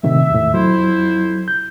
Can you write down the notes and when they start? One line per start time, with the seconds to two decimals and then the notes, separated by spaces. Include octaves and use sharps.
0.03 A2 C3 D#3 E5
0.30 E2 A2
0.54 F2 F#3 E4 C5
1.48 G6